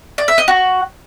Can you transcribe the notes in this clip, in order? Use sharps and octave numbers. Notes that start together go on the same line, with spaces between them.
D5
E5
D#5
F#4